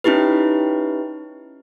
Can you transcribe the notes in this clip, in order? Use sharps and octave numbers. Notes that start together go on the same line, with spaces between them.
C#4 D#4 E4 G4 B4